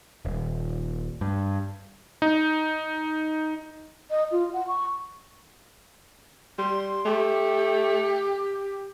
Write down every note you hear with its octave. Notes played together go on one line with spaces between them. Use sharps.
D#1
G2
D#4
D#5
F4
F#5
C#6
G3 C6
A3 G4